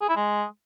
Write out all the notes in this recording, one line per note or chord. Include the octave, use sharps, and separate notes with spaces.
G#4
E4
G#3